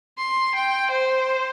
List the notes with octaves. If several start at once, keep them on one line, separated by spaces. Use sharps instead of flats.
C6
G5
C5